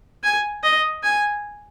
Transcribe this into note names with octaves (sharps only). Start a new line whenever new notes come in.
G#5
D#5
G#5